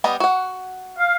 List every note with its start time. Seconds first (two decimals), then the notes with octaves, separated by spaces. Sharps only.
0.04 G3 B3 D#5
0.20 F#4 F#5
0.97 F5